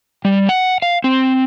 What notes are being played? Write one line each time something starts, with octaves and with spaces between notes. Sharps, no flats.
G3
F#5
F5
C4